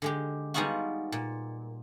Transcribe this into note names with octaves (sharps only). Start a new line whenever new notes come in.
D3 G#3 G4
G3 G#3 B3 D#4 F4 F#4
A#2